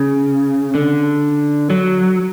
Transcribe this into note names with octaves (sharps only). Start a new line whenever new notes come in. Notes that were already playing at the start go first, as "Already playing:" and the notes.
Already playing: C#3
D3
F#3